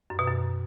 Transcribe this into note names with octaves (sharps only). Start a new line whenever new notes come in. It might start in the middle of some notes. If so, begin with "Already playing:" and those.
F#2
B2
F#2